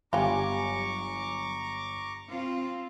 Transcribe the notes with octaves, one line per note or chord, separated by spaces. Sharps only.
G1 F#3 G3 F4 G#5 A#5 C#6 D6
C4 F4